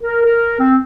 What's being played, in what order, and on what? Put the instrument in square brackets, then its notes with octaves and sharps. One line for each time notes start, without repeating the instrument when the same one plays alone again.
[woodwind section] A#4
A#4
C4